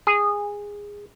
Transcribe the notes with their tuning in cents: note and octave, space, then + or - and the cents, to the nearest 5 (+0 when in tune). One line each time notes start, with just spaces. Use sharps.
G#4 -15